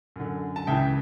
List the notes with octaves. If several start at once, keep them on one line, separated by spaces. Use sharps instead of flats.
F#2 D3
A5
C#2 C#3 E3 E5 G5